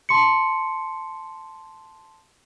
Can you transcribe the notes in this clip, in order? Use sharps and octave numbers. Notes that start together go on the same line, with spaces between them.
A5 C6 C#7